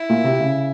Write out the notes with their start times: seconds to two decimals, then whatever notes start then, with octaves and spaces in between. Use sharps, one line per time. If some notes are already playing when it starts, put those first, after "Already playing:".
Already playing: E4
0.09 A#2
0.24 C3
0.40 C#3